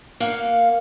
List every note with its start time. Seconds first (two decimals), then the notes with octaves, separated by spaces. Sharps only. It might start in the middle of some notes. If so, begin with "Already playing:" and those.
0.20 A#3 F5 F#5